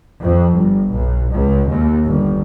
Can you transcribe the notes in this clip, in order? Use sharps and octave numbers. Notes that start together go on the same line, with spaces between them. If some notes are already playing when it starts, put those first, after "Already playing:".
F2
G1
B1
C#2
D#2
G1